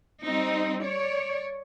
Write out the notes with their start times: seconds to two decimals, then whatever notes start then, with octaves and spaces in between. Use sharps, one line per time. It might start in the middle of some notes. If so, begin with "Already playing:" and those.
0.23 G3 C4 D#4
0.83 C#5 D5